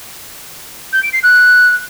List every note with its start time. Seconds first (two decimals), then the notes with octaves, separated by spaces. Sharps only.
0.93 G6
1.03 D7
1.13 C7
1.23 F#6